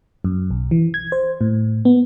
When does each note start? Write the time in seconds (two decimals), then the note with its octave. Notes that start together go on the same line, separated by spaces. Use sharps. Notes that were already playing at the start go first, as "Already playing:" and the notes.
0.24 F#2
0.51 B1
0.71 E3
0.94 G#6
1.12 C5
1.41 A2
1.85 B3